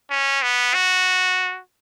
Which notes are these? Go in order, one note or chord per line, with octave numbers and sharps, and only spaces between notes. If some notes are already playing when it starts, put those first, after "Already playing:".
C#4
B3
F#4